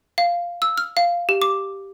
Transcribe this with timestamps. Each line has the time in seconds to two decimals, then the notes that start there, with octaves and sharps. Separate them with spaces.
0.18 F5
0.62 E6
0.77 F6
0.97 F5
1.29 G4
1.42 D6